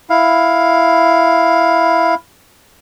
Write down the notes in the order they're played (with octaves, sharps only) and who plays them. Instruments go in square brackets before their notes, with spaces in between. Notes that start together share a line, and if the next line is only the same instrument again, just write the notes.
[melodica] E4 F5